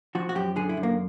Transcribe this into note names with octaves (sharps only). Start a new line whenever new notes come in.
F3 F#4
F#4
F#2 G4
D3 G#4
E4
F#2
A#3